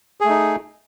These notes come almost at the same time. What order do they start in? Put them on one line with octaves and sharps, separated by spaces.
G#4 A3 D#4